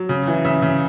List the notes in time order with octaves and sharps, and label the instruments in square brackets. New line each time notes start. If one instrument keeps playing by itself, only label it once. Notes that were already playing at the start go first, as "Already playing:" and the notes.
Already playing: [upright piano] F#3
C#3
E3
C#3 E5
C#3